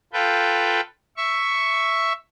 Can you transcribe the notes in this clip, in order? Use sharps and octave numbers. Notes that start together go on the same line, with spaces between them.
F4 A4 B4 G5
E5 C#6